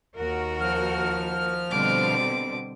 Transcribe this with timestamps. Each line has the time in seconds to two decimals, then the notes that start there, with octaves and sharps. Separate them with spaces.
0.15 D#2 F#4 A#4
0.61 F3 F6
1.70 B2 D3 G3 C4 D6